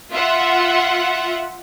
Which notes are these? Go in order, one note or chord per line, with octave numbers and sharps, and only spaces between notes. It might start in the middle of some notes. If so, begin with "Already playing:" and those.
F4 E5 F#5